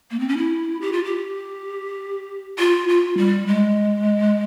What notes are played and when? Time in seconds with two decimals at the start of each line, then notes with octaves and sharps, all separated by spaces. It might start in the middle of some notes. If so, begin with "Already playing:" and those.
0.11 A#3
0.19 C4
0.28 C#4
0.37 E4
0.81 G4
0.93 F4
1.05 G4
2.59 F4
2.89 F4
3.18 G3
3.48 G#3